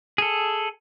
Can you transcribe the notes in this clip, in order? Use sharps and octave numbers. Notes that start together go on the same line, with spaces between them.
G#4 A4